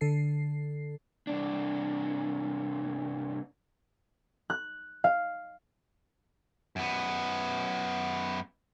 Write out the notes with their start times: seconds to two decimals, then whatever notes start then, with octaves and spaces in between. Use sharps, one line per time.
0.01 D3 A4 C7
1.27 C2 D4
4.50 F#6
5.04 F5
6.76 F#2 B3